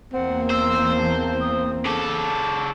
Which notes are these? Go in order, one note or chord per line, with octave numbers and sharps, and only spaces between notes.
E2 A#3 C4 F#5
C5 E6
A5
D#6
C#3 A4 D6